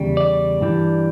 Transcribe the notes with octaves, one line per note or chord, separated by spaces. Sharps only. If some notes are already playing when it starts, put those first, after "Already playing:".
Already playing: E2 C#3 G3
D5
G2 E3 G3